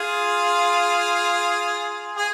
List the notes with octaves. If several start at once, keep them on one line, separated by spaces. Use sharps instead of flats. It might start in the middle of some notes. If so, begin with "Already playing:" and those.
Already playing: F4 G#4
G#4